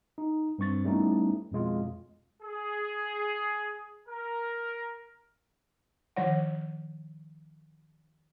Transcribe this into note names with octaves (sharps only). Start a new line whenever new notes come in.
D#4
G2 C4 C#6 A6
G3 A3 B3 C#4 D#4 E4
F2 B2 G#3 F4
G#4
A#4
D#3 F3 C#5 F#5